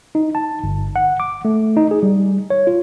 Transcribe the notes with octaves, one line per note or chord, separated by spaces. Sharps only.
D#4
A5
G1
F#5
D6
A3
D#4
G#4
G3
C#5
F4